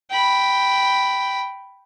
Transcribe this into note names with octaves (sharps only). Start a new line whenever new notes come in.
G5 B5